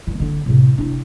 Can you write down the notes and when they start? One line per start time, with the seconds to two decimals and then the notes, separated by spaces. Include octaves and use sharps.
0.07 G2 D#3
0.20 D3 D4
0.46 A2 C3
0.78 D4 E4